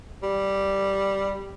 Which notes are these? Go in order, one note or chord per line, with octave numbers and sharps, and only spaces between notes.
G3